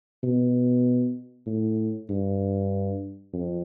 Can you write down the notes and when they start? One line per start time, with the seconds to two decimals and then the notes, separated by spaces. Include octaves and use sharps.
0.23 B2
1.46 A2
2.09 G2
3.34 F2